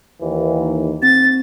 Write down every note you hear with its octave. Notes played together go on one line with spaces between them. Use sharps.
D#2 E3
C4 A6